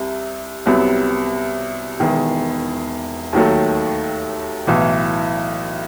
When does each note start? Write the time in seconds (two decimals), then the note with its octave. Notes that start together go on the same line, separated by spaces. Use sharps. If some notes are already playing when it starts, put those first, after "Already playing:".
Already playing: C2 C3
0.66 C2 C3 F#3 B3
2.00 E1 E2 D#3
3.33 D#2 D#3 F#3 A3
4.67 B1 A2 E3